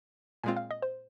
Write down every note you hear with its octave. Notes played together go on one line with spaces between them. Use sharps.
A#2 G#3 C4 F4 G#5
F5
D#5
C5